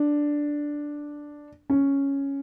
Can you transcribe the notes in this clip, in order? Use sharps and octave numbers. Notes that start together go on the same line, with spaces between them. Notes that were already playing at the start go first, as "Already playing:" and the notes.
Already playing: D4
C#4